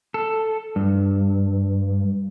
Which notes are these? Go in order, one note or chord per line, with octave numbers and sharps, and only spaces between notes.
A4
G2